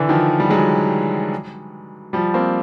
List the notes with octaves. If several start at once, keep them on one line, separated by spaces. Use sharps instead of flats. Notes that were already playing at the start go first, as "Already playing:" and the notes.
Already playing: D3 E3
D#3 F3
G3
F#3 G#3
F3 G3
A#3 C4